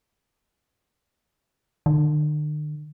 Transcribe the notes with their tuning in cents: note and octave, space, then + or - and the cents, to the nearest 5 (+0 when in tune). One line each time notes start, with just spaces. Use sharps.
D3 +45